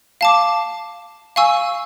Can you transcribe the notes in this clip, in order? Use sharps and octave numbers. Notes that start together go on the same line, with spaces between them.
F5 A5 D6
F5 G#5 C#6 E6